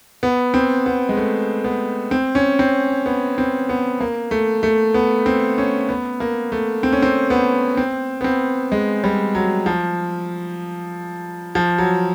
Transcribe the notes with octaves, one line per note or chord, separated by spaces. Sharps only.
B3
C4
B3
G#3
A3
B3
C4
C#4
C4
B3
C4
B3
A#3
A3
A3
B3
C4
C#4
B3
A#3
A3
C4
C#4
C4
B3
C4
B3
C4
G#3
G3
F#3
F3
F3
F#3